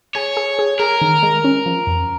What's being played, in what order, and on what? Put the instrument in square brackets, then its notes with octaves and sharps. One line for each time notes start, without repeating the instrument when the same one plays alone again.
[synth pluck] G#4 [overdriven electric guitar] C#5
[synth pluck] G#4
G#4
[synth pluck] G#4 [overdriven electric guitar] A#4
[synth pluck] D#3
G#3
C#4
F3
F2